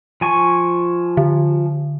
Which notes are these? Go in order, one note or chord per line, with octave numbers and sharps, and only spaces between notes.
F3 G#5 C#6
D3